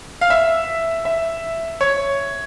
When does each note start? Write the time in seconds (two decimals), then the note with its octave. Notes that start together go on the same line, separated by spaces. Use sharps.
0.21 F5
0.30 E5
1.05 E5
1.81 C#5